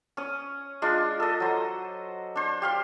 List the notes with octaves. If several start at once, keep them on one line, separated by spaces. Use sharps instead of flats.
C#4 D#6
G#3 D4 F4
A4 D#5
F#3 C5
D4 C5
G4 F5 C6